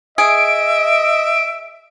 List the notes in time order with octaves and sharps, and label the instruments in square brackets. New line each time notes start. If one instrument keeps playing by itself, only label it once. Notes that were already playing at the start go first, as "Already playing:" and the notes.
[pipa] G#4 [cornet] D#5 [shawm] E5 [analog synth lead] D7